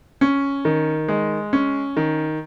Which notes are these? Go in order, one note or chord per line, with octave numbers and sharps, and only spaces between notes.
C#4
D#3
G#3
C#4
D#3